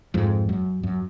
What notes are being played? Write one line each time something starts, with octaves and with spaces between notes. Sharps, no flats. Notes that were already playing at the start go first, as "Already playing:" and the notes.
F2 G#2
F#2
F#2